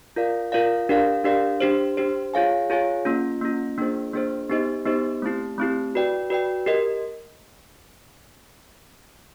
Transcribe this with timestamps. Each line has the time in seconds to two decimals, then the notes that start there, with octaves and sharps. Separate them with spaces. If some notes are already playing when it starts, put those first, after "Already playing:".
0.16 F4 A#4 D5 F5
0.52 F4 A#4 D5 F5
0.89 D4 G4 A#4 D5 F5
1.24 D4 G4 A#4 D5 F5
1.60 D4 G4 C5
1.97 D4 G4 C5
2.34 F4 G#4 C#5 F5 G#5
2.70 F4 G#4 C#5 F5 G#5
3.05 A#3 C#4 F4
3.41 A#3 C#4 F4
3.78 A#3 D4 F4 G#4 C5
4.13 A#3 D4 F4 G#4 C5
4.50 B3 D#4 G4 C5 D#5
4.86 B3 D#4 G4 C5 D#5
5.22 A3 C4 E4 G4
5.58 A3 C4 E4 G4
5.95 F#4 B4 D5 G5
6.30 F#4 B4 D5 G5
6.66 G4 A#4 D#5